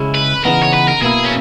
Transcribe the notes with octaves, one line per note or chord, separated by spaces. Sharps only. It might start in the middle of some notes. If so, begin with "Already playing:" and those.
Already playing: C#3 G#3 C#4 E4
B4
C#3 E3 B3 D#4 A#4
C#5
B4
A#4
B2 A#3 E4 G#4
C#4